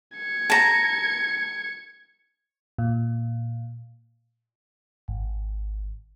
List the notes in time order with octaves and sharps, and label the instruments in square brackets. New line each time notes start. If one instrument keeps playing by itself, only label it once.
[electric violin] G#6 C#7
[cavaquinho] A5 A#5
[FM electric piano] A#2
G#1